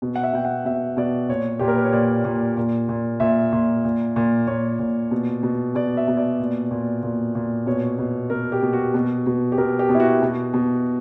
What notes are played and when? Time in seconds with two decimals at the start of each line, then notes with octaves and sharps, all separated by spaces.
0.02 B2
0.16 F#5
0.23 E5
0.33 B2 G5
0.45 F#5
0.65 B2 E5
0.97 B2 D5
1.29 A#2 C#5
1.59 A#2 G4
1.68 A#4
1.76 B4
1.85 C#5
1.93 A#2 D5
2.25 A#2
2.57 A#2
2.89 A#2
3.20 A#2 E5
3.53 A#2
3.85 A#2
4.16 A#2
4.47 A#2 C#5
4.79 A#2
5.11 B2
5.43 B2
5.75 B2 D5
5.97 E5
6.08 B2
6.17 D5
6.39 A#2
6.71 A#2
7.03 A#2
7.35 A#2
7.66 B2 C#5
7.99 B2
8.30 B2 A#4
8.52 G4
8.62 B2
8.73 F#4
8.94 B2
9.26 B2
9.52 G4
9.58 B2 A#4
9.79 G4
9.89 B2
9.95 E4
10.00 F#4
10.22 B2
10.54 B2